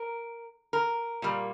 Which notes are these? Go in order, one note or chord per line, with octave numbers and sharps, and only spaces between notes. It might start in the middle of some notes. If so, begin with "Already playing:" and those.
Already playing: A#4
A#4
A#2 G3 A#3